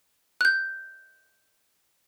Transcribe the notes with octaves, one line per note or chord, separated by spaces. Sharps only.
F#6 G6